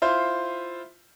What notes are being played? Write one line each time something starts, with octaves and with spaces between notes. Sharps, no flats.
E4 F4 C5 C6